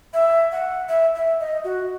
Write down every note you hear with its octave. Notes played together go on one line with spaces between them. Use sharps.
E5
F#5
E5
E5
D#5
F#4